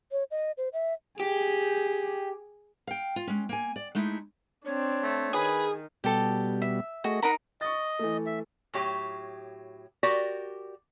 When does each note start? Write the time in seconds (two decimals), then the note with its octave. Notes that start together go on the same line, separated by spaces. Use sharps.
0.12 C#5
0.31 D#5
0.57 C5
0.73 E5
1.20 G4 G#4
2.87 F5 G5
3.16 F4
3.27 G#3 C#4
3.49 A#3 G#5
3.76 D5
3.95 G#3 A3 D#4 E4
4.65 C4 D4 C#5
5.03 A3
5.34 D#3 G#4 B4 G#5
6.04 B2 G3 G4 A4
6.62 E5
7.04 A3 F#4 G#4 D#5
7.22 D#4 A#4 F#5 A#5 B5
7.61 D#5 C#6 A6
7.99 E3 A3
8.26 E5
8.74 A2 F#3 G4
10.03 F#4 G4 A#4 D5